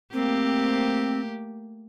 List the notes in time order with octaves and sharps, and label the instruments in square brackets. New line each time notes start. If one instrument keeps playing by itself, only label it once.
[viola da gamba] A3 A#3 G4 [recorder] C4